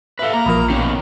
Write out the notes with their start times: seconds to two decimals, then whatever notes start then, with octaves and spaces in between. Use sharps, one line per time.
0.19 A4 B4 E5 F5
0.34 A#3 A#5
0.46 A#1 F3 A#4 B5 D#6 F6
0.70 B2 D#3 C#4